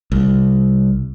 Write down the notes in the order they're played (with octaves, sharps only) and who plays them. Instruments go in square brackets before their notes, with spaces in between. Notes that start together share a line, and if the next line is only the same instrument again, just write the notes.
[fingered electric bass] C2